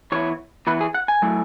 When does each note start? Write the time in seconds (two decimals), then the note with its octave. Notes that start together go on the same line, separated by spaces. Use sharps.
0.12 E3 B3 E4 C#5
0.67 E3 B3 E4 B4
0.81 G#4
0.94 F#5
1.08 G#5
1.22 F#3 A3 E4